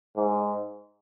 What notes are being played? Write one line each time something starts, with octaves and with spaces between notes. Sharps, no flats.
G#2